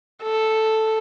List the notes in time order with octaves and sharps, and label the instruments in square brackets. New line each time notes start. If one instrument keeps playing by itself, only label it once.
[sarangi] A4